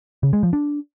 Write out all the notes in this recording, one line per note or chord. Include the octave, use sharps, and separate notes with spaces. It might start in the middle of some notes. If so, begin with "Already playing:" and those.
C#3
G#3
F3
D4